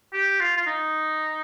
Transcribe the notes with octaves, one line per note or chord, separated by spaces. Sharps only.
G4
F4
F4
D#4